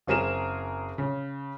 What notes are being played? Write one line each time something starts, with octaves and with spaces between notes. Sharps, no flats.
F#1 C4 G#4 A#4 E7
C#3